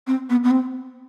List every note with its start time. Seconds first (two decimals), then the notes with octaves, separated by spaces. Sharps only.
0.07 C4
0.30 B3
0.44 B3
0.51 C4